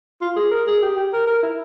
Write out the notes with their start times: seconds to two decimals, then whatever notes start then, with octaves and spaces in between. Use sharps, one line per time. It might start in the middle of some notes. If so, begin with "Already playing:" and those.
0.21 F4
0.36 G#4
0.51 A#4
0.67 G#4
0.82 G4
0.97 G4
1.13 A#4
1.27 A#4
1.43 E4